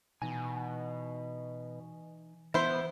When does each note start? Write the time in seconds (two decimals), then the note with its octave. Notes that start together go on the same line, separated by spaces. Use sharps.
0.22 B2 E3 D#4 G#5
2.54 E3 B3 E4 C5